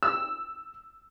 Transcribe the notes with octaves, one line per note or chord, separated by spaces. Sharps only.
E6